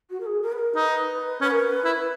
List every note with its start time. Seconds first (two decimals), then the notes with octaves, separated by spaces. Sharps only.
0.10 F#4
0.20 A#4
0.26 G#4
0.42 A#4
0.52 B4
0.58 A#4
0.75 D#4 B4
1.41 C#4 B4
1.51 A#4
1.59 B4
1.85 E4